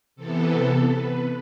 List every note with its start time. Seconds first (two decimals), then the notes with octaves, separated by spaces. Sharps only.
0.16 C3 E3 B3 A4
0.86 B4